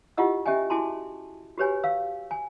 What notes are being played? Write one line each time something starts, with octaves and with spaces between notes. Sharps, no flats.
E4 F4 G4 D#5 F#5 E6
C#4 G4 D#5 E5 G5 G#5
E4 F#4 G#4 G#5 A5 C6
F#4 G4 B4 C#5 G#5
F5 E6
G#5